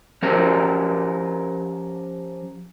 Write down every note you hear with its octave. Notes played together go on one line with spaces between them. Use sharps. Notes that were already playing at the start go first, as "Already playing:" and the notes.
F3 C#4 G4 A#4